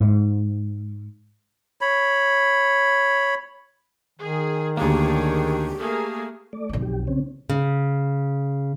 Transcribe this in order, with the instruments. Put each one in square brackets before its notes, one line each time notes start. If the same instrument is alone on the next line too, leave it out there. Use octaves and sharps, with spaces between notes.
[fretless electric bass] G#2
[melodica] C#5 B5
[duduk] D#3 [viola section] G#4
[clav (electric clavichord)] D2 A#3 [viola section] D4 G#4 C#5 [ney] G4
[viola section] A3 A#3 G#4
[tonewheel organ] A3 D5
[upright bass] B1 F2
[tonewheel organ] G4
C#3 C4 C#4
[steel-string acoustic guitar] C#3